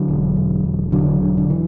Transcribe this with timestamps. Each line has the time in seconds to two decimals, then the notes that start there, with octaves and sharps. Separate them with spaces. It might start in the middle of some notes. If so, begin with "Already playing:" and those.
Already playing: D3 F#3
0.08 E1
0.36 E1
0.64 E1
0.92 E1 D3 F#3
1.22 D3
1.37 D3
1.50 E3